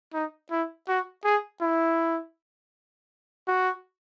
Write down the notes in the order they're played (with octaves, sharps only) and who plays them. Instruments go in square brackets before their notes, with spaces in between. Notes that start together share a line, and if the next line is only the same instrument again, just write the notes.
[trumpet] D#4
E4
F#4
G#4
E4
F#4